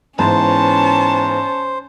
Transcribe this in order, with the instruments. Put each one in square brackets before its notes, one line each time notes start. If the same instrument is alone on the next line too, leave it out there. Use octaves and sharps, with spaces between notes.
[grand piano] G#2 E3 B3 [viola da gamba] C#4 [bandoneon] C5 [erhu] A5